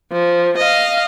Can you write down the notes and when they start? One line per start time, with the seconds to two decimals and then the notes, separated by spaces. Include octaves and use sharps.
0.12 F3
0.58 D#5 F5